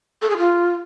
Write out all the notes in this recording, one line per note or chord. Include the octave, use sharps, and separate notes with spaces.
A4
G#4
F4